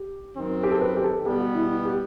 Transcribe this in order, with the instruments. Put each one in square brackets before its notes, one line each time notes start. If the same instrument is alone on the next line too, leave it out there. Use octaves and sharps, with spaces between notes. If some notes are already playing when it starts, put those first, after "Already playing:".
Already playing: [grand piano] G4
[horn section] F#2 D#3 F#3 C4
[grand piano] G4
A4
B4
G4
A4
[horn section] B2 G3 B3 [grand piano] G4
[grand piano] F#4
E4
F#4
G4